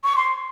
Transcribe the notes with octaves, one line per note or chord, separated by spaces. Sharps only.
C#6
C6